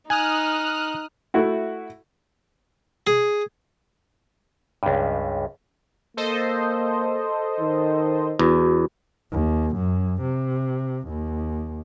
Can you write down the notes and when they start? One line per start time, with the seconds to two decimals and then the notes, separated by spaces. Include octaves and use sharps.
0.10 D#4 G#5 D#6 F6 F#6
1.34 A3 E4 F#4
3.07 G#4
4.83 C#2 G2
6.17 A#3 A4 C5 D#5
7.60 D#3
8.39 E2 F#4
9.32 D#2
9.76 F#2
10.22 C3
11.08 D#2